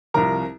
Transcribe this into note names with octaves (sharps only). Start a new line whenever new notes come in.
C2 C3 F3 A#4 A#5